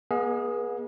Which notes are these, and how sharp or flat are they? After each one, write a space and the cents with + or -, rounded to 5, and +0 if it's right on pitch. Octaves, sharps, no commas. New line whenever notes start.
B3 -35 G#4 +0 D#5 +45